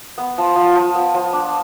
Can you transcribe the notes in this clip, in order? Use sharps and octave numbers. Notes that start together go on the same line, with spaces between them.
B3
F3
F3
F3
B3
F3
D4